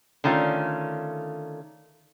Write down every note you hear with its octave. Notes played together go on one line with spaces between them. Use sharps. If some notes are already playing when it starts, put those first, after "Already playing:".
D3 D#3 A3 C#4 F4